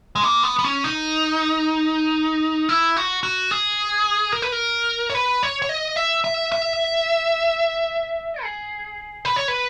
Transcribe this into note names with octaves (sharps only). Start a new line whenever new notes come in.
G#3
A#3
B3
B3
C#4
D#4
E4
F#4
F#4
G#4
A#4
B4
A#4
C#5
B4
C#5
C#5
D#5
E5
E5
E5
G#4
B4
C#5
B4